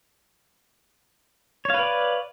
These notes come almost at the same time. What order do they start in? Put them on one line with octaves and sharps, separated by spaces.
C#5 F5 B4 D5